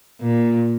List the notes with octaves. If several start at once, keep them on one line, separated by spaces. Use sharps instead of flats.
A#2